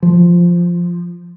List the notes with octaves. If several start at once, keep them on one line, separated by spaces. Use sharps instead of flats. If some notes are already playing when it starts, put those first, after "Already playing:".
F3